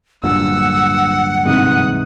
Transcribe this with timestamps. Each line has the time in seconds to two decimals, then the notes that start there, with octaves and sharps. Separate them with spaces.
0.24 D1 G2 A#2 F#5 E6
1.45 G#2 C3 E3 D#6 F#6